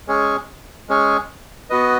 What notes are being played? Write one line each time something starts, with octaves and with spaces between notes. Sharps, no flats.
G#3 C#4 G#4 C#5
G#3 C#4 G#4 C#5
B3 F#4 B4 D#5